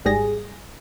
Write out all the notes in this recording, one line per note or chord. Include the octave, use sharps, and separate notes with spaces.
G#1 G#2 G3 G#4 A#6